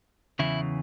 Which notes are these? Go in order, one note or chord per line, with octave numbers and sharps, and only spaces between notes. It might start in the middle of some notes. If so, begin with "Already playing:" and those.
E2 C#3 E3 E4